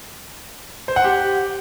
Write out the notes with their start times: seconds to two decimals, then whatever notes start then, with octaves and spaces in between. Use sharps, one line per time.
0.88 C5
0.96 F#5
1.04 G4